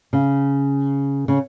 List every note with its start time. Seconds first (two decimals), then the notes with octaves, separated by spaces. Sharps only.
0.13 C#3
1.28 C#3